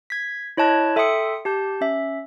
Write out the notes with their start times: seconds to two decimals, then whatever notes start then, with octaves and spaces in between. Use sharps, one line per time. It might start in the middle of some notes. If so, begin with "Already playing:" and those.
0.10 G#6 B6
0.57 E4 C#5 D#5 A5 F#6 G#6
0.96 A4 E5 G5 C6 D#6 C#7
1.45 G4 A5 G6
1.81 C#4 E5